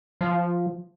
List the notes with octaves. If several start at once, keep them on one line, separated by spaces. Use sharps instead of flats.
F3